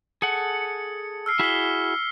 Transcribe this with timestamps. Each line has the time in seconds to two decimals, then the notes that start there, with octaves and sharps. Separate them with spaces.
0.22 G#4 A4 F#5 C#7
1.26 E6 F6 C7
1.39 E4 F#4 G#4 B6 G7